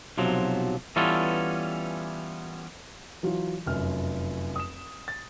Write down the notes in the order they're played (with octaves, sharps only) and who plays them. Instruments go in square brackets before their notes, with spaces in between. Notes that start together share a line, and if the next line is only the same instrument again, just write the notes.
[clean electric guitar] B1 C3 F3 F#3
E3 G3 B3 C#4 F4 A4
[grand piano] E3 F#3 F4
F1 F#2 F6
D#6 E7
A6